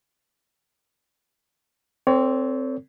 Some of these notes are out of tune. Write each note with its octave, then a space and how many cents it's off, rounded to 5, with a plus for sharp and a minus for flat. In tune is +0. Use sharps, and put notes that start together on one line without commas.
C4 +0 A4 +40 C#5 +40